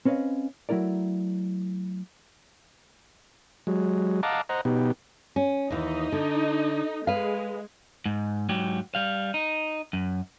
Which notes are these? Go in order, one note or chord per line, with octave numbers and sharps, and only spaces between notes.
C4 C#4 B4 D#5 F5
F#3 A3 E4 A#4 D5
F#3 G#3
D#5 F5 F#5 A5 A#5 D6
C5 D#5 F#5 A#5
B2 B3 D#4 G4
C#4
D#2 E3 D#4
D3
G#3 B4 F5
G#2
G#2 F#3 G4
G3 F5
D#4
F#2